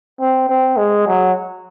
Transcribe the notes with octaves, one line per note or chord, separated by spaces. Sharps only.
C4
C4
G#3
F#3